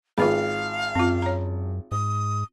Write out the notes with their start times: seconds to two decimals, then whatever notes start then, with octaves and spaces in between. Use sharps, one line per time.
0.18 G#1 F4 B4 F5 B5
0.95 F#2 C4 F4
1.22 C#5 A#5
1.92 G#2 D#6